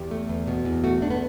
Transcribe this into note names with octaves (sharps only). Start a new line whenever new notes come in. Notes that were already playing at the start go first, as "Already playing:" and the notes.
Already playing: E2 G4
A3
E2
B2
E2
A3 F#4
E2 D4
B3